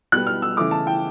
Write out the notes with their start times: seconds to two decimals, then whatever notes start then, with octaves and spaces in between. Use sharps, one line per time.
0.12 B2 G3 B3 F#6
0.27 F6
0.42 E6
0.57 C#3 E3 A3 D6
0.71 A5
0.87 G5